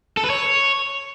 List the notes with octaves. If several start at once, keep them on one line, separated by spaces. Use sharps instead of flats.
A4
B4
C#5